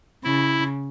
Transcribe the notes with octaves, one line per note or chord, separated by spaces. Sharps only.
C#3 E4